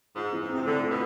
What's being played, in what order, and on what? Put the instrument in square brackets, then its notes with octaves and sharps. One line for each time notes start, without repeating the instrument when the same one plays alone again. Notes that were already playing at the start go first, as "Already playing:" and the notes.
[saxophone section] G#2 [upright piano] F4
[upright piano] E3
[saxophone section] G#2
[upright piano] C4
[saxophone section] C3
[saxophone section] D3 [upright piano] A3
[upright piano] F4
[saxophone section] B2